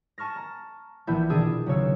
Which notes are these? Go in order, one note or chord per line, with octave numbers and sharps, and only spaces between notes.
G#5 A5 C#6 F6 A#6
A5 A#5
A#1 E3 E4 G6
B2 D#3 D4 G#4 D#6 E6
B1 C#3 C#5 E6